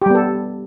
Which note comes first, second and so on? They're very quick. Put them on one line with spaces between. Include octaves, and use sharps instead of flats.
G4 G3 B3 A4